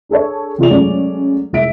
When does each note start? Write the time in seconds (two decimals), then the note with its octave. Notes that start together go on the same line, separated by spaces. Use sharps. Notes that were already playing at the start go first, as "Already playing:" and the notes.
0.09 D4 G#4 A4 C#5
0.58 E2 C3 F4 G#4 D5 F7
0.70 F#3 G#3 A3 C#4 D5
1.53 F1 C2 G#3 E5 B6 D7